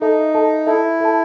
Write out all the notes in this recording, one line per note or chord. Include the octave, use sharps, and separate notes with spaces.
D#4 A4 E5 A5
A4 E5 A5
E4 A4 E5 A5
A4 E5 A5